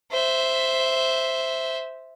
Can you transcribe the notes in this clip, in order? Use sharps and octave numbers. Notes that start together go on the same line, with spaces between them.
C5 E5